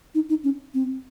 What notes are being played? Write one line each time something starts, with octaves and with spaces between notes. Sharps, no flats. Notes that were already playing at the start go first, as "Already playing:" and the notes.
D#4
D#4
C#4
C4